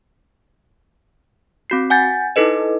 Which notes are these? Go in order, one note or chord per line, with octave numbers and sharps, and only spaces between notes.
C4 F#4 C7
F#5 G#5 G6 A6
D#4 E4 A4 B4 D#5